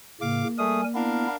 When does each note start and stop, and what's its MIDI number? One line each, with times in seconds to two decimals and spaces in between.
0.21 0.44 45
0.21 0.44 49
0.21 1.22 58
0.21 0.48 77
0.21 0.48 86
0.58 0.84 55
0.58 0.81 57
0.58 0.81 68
0.58 0.84 70
0.58 0.84 80
0.58 0.81 87
0.95 1.27 59
0.95 1.36 62
0.95 1.27 64
0.95 1.36 70
0.95 1.36 77